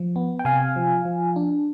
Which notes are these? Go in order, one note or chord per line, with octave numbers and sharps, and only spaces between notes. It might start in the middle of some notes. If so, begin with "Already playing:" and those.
Already playing: F3
B3
G5
C3 F5 G#5
F3
F3
D4